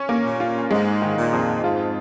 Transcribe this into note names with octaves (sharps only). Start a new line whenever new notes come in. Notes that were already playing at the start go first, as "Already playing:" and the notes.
Already playing: C#4
A#3
A#2
F4
G#2 G#3
D#3
A#2
F2
G#2 F4